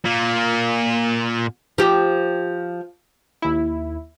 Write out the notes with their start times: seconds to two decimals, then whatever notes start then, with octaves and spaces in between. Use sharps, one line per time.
0.05 A#2 A#3
1.78 F3 G4
3.42 D#2 E4